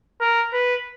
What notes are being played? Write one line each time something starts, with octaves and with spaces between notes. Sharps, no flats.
A#4
B4